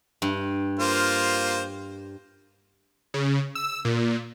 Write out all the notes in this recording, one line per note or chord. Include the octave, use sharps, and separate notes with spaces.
G2
A#3 F4 C5
C#3
E6
A#2